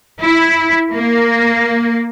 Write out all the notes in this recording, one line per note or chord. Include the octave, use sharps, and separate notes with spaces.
E4
A#3